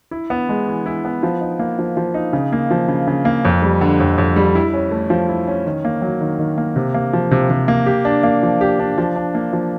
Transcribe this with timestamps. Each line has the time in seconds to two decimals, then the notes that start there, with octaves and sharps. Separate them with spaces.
0.11 E4
0.30 B3
0.49 G#3
0.68 E3
0.86 E4
1.05 B3
1.23 F3
1.41 D#4
1.59 A#3
1.79 F3
1.97 F3
2.14 D#4
2.33 C#3
2.52 A#3
2.71 F3
2.88 C#3
3.07 C#3
3.25 A#3
3.45 F2
3.62 G3
3.81 D3
4.00 F2
4.18 F2
4.36 G3
4.55 E4
4.74 C#4
4.92 A3
5.10 F3
5.29 E4
5.47 C#4
5.66 D#3
5.85 A#3
6.02 F#3
6.21 D#3
6.39 D#3
6.58 A#3
6.76 C3
6.94 A#3
7.13 F3
7.31 C3
7.50 C3
7.68 A#3
7.86 G4
8.05 D4
8.23 A#3
8.43 F3
8.61 G4
8.79 D4
8.98 F3
9.16 D4
9.35 A#3
9.53 F3